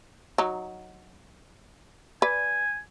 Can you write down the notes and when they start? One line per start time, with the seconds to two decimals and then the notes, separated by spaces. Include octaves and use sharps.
0.38 F#3 D#4
2.22 B4 D5 G#5